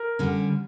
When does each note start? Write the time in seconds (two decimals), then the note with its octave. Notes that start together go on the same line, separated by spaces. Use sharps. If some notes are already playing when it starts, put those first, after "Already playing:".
Already playing: A#4
0.19 D3 G3 C#4